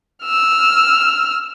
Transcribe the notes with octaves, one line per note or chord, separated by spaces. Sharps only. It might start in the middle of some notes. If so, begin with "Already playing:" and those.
E6 F6